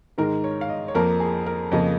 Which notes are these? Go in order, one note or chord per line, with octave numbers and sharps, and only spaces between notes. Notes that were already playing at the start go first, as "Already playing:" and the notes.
G#2 D#3 G#3 A#4
C#5
F5
D#5
C#5
F2 F3 A#3 A#4
G#4
A#4
F2 C#3 F3 A#3 D#5